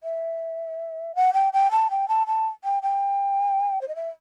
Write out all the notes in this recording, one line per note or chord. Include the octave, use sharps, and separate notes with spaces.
E5
F#5
G5
G5
A5
G5
A5
A5
G5
G5
C5
D#5
E5